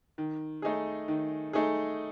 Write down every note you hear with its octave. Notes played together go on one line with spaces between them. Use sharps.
D#3
A3 D#4 G#4
D#3
A3 D#4 G#4